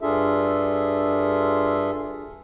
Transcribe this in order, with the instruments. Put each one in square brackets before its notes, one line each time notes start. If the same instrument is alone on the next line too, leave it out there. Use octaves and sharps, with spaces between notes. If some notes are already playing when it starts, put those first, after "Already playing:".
[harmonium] G2 D4 F4 G#4 A4 E5